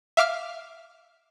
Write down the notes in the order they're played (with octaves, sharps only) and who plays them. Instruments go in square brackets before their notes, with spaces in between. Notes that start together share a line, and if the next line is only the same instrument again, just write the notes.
[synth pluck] E5 F5 D6 F6